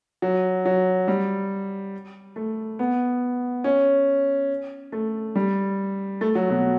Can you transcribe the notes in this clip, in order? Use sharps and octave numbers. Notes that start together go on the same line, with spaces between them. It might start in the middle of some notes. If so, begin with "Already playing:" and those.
F#3
F#3
G3
A3
B3
C#4
A3
G3
A3
F#3
B2